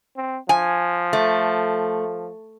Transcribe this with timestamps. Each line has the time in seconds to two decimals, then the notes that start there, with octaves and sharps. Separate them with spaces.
0.17 C4
0.49 F3 G#5
1.13 A3